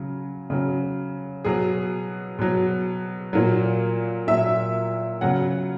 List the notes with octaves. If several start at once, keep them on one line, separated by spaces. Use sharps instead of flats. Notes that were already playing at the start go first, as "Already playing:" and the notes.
Already playing: C#3 F#3
C#3 F#3
B2 F#3 G#4
B2 F#3
A#2 F#3
A#2 F#3 E5
C#3 F#3 F#5